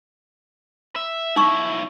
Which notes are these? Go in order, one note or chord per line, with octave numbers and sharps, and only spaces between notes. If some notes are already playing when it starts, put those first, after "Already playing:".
E5
B1 D#4 E4 C#6